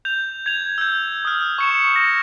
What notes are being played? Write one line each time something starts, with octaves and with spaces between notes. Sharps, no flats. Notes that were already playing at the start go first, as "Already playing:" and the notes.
G6 F7
G#6 F7
E6 G6
D#6 F6
C#6 C#7 E7
A#6